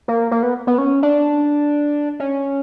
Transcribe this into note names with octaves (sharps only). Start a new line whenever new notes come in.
A#3
A#3
B3
B3
C#4
D4
C#4